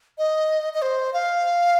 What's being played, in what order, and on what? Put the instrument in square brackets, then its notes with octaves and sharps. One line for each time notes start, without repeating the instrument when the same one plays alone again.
[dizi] D#5
D#5
C5
F5